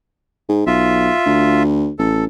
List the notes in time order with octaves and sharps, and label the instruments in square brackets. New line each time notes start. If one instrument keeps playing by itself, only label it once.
[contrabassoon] G#2
[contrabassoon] B1 [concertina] F4 E5
[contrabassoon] D2
[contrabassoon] A1 [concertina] A4